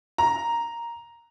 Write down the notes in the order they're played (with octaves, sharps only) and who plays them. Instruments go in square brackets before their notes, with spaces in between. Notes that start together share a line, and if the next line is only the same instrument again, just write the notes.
[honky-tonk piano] A#5